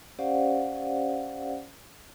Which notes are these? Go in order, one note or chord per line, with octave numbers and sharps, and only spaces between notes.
C#4 G4 C5 D5 F5 F#5